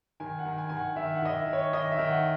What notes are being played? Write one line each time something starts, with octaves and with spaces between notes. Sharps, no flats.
D#3 G#5
F#5
D#3
G#5
D#3 G#5
F#5
D#3 E5
F#5
D#3 D#5
E5
D#3
C#5
D#3 D#5
E5
D#3
F#5